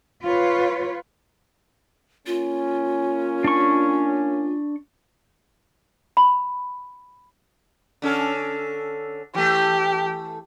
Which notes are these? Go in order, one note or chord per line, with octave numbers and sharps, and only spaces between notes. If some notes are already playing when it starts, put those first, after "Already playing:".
F4 B4 C#5
A#3 C#4 F4
D4 C#6
B5
D3 C#4 A4
E3 A3 G4